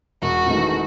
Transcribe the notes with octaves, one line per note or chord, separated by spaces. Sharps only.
E1 F#4
E2 D#3 A3